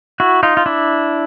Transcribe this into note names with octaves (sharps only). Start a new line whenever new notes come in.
E4 F#4
D#4 F4
F4
D4 E4